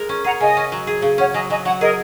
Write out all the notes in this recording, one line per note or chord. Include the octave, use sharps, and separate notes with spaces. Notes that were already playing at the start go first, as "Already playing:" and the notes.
Already playing: G#3 A#4
C#4
G#4 F#5 A#5
C#3 D#5 G#5
C#4
F#3
G#4
C#3
C#4 C#5 F#5
F#3 D#5 G#5
F#3 D#5 G#5
F#3 C#5 F#5
G#4 A#4 D#5